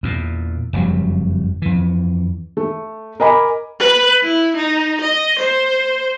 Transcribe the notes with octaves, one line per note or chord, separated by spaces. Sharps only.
E2 A#2
F#1 F2 F#3 G3
F2 E3
A3
A#4 D#5 G#5 B5 D6
B4
E4
D#4
D#5
C5